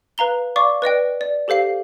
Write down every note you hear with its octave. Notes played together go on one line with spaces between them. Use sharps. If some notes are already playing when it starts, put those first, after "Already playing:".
B4 F5 A#5 G7
D5 F5 C#6 D6
B4 D5 D#5 G5
D5
G4 A4 C5 F5 C7